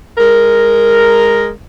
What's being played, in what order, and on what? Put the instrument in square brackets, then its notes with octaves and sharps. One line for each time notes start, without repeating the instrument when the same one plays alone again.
[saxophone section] G#3 A#4